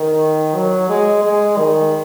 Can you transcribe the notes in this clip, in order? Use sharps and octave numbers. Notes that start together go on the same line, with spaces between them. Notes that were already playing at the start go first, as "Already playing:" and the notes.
Already playing: D#3
F#3
G#3
G#3
D#3